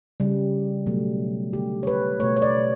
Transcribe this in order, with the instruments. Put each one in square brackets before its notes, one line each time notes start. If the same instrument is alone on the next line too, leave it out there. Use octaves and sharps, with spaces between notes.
[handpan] C#3 G3
B2 F#3 A3
D3 A3 G4
C#5
B4
A3 C#5
B2
C#5
D5